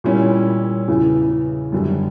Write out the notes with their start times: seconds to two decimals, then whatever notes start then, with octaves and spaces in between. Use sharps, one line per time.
0.04 A#2 G3 C#4 E4
0.88 E2 C#3 E3
1.72 F#2 D3 G3